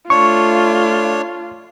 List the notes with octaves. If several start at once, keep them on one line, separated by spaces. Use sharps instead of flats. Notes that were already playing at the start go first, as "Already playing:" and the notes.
A3 D4 F4 C#5 C#6